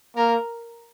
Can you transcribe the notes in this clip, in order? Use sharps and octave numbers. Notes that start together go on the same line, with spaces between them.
A#3 A#4